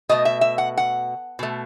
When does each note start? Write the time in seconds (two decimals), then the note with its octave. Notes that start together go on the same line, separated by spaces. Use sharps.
0.09 B2 A3 D#5
0.25 E5
0.41 E5
0.58 F#5
0.77 F#5
1.39 B2 A3